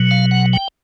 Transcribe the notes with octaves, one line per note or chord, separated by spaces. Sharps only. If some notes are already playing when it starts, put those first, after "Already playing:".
Already playing: B2 F#3
F5
F#5
G5